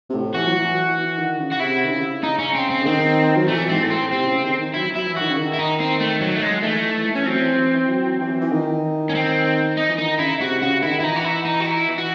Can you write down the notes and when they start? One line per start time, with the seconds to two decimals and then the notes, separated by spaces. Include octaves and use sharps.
0.10 C3
0.13 A2
0.34 E3 F#4
0.46 F#3
0.58 E3
0.97 E3
1.18 D#3
1.39 C#3
1.52 F#4
1.60 C3 E4
1.85 D#3
1.91 C#3
2.23 D#4
2.39 C#4
2.55 C4
2.70 C4
2.81 C#3
2.86 D#3 C4
3.36 F#3
3.48 E3 A3
3.69 G#2 C4
3.81 A2 A3
3.90 C4
4.11 C3 C4
4.27 C#3
4.43 D#3
4.59 D#3
4.74 F#3 E4
4.90 F#3
4.96 E4
5.06 E3
5.17 D#3 F#4
5.30 C#3
5.38 D#3
5.53 E4
5.58 D#4
5.80 C4
6.00 A3
6.21 F#3
6.36 A3
6.43 G#3
6.60 D#3
6.63 E3 A3
6.84 E3
7.05 E3
7.16 C#4
7.26 F#3 C4
7.41 E3
7.57 E3
7.74 E3
7.89 F#3
8.21 E3
8.40 E3
8.52 D#3
9.09 C#4
9.15 C4
9.77 D#4
9.89 E3
9.98 D#3 D#4
10.19 C#3 E4
10.41 C3 F#4
10.61 C#3 F#4
10.83 D#3 E4
11.00 E4
11.03 E3 D#4
11.16 F#4
11.25 E4
11.45 D#4
11.60 F#4
11.66 E4
11.87 E3
11.98 F#4